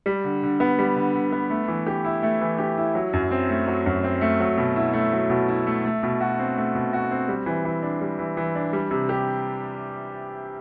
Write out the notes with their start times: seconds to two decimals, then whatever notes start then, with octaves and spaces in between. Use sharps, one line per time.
0.06 G3
0.24 D3
0.43 D3
0.60 B3
0.79 G3
0.96 D3
1.15 D3
1.32 B3
1.50 A3
1.68 E3
1.87 G4
2.05 E4
2.23 A3
2.41 E3
2.58 G4
2.78 E4
2.95 F#3
3.13 F#2
3.31 C4
3.49 A3
3.67 F#3
3.86 F#2
4.04 C4
4.21 A3
4.40 F#3
4.57 B2
4.76 E4
4.93 A3
5.12 F#3
5.29 B2
5.48 E4
5.67 A3
5.85 A3
6.03 B2
6.21 F#4
6.39 C4
6.57 A3
6.75 B2
6.93 F#4
7.11 C4
7.28 G3
7.46 E3
7.65 E3
7.83 D4
8.01 G3
8.19 E3
8.37 E3
8.55 D4
8.73 G3
8.91 C3
9.09 G4